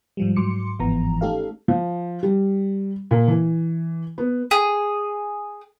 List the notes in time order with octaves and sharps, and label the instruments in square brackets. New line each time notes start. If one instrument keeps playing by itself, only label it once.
[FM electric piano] G#2 F3 G3
G#2 F#3 C6 D6 C#7
G1 G#2 E3 F3 B3 A#5
A3 C#4 D#4 G4 A4 F5
[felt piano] F3
G3
A#2
E3
B3
[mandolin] G#4